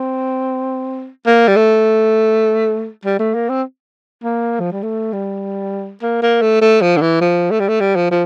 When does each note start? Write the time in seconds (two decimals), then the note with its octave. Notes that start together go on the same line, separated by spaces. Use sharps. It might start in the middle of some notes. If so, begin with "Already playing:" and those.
Already playing: C4
1.26 A#3
1.48 G3
1.56 A3
3.05 G3
3.19 A3
3.34 A#3
3.49 C4
4.24 A#3
4.60 F3
4.72 G3
4.83 A3
5.13 G3
6.02 A#3
6.22 A#3
6.42 A3
6.61 A3
6.81 F3
6.96 D3
7.01 E3
7.21 F3
7.51 A3
7.60 G3
7.68 A3
7.80 G3
7.95 F3
8.11 F3